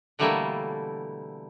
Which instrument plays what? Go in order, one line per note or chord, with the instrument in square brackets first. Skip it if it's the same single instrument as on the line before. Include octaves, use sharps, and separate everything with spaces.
[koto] B2 D3 E3 G3 A3 A#3